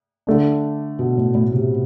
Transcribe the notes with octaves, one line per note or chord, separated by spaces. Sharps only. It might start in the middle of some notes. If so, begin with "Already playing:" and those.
D3 A3 D4
B2
A2
A2
C3